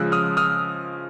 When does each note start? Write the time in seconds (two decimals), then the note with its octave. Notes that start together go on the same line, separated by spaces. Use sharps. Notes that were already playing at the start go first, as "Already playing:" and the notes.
Already playing: C#3 F3 G#3 E6 F#6
0.12 D#6 F6
0.37 D#6 F6